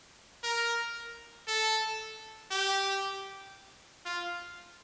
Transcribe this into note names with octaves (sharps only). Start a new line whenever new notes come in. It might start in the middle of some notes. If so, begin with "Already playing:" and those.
A#4
A4
G4
F4